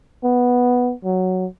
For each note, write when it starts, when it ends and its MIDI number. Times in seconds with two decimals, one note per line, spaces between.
0.24 0.93 59
1.04 1.47 54